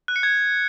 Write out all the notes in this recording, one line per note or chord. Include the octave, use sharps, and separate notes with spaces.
F#6
C#7
G#6